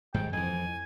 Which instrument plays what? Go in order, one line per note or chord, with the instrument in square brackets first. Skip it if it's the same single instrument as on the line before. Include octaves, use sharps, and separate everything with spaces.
[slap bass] G#2 D#3 G3 [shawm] G5
[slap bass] F2 E3 [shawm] G#5